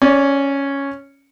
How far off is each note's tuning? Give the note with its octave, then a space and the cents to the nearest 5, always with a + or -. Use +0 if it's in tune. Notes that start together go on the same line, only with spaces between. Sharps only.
C#4 +0 D5 -20